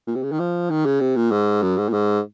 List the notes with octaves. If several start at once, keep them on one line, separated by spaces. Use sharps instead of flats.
A#2
C3
C#3
D#3
F3
D#3
C#3
C3
A#2
G#2
F#2
G#2
A#2
G#2